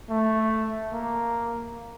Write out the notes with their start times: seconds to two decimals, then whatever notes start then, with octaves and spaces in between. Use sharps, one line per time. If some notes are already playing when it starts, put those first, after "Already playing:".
0.10 A3
0.92 A#3